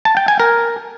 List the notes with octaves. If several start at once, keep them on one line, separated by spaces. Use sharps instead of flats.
A5
G5
G#5
A#4